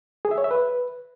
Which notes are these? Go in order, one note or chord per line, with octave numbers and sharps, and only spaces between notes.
G#4
E5
C#5
E5
B4